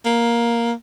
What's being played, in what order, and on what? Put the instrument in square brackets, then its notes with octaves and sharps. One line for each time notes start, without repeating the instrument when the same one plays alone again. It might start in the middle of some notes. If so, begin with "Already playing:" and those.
[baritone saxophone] A#3